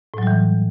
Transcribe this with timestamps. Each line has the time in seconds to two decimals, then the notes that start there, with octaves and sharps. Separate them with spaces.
0.14 A2
0.18 F#3
0.23 G3
0.27 E3